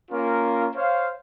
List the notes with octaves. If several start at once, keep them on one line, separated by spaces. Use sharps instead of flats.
A#3 C#4 F4 A#4
C5 C#5 F5